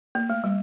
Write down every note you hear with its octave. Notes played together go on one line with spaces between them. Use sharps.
A#3
A3
G3